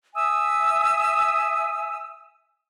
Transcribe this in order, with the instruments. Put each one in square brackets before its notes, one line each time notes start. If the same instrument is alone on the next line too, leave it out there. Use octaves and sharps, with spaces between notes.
[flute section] E5 G#5 D#6 E6